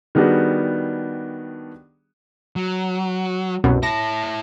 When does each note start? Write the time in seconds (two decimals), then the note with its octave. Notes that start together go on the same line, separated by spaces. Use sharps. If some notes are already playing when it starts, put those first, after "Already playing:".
0.15 D#3 G3 B3 D4 F#4 G#4
2.56 F#3
3.64 C2 F#2 B2
3.83 E4 A5 A#6